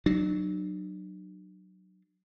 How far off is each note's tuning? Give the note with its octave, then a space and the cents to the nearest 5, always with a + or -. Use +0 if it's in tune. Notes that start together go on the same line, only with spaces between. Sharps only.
F#3 +5 D4 +45